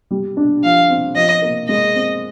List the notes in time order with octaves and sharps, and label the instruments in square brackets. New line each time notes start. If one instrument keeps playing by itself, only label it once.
[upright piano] G3
D4
[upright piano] F3 [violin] F5
[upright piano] C4
[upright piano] F3 [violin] D#5
[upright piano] A#3
[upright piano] G#3 [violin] D#5
[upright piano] C4